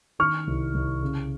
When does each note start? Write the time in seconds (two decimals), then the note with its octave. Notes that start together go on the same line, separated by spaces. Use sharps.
0.19 D#3 C#6 F6
0.47 C2
0.74 C2
1.02 C#3